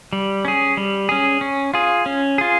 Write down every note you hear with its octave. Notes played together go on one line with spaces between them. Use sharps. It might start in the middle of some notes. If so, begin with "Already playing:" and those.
G3
C#4 G#4
G3
C#4 G#4
C#4
F4 G#4
C#4
F4 G#4